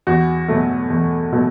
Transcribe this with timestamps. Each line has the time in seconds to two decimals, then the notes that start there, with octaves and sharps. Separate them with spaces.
0.07 E2 F#4
0.48 B2 F#3 A3
0.90 E2
1.32 B2 F#3 A3